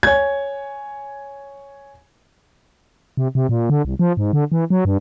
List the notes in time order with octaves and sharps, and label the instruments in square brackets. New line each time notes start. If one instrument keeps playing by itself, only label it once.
[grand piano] C#5 G#5 G#6
[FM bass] C3
C3
A#2
D3
C2
F3
G#2
D3
E3
F#3
G2